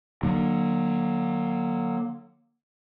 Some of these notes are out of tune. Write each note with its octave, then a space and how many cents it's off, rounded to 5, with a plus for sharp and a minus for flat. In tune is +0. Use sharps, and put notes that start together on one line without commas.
D3 +35 F#3 +0 A#3 +25